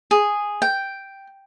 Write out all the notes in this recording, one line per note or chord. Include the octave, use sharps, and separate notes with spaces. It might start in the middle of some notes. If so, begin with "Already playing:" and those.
G#4
G5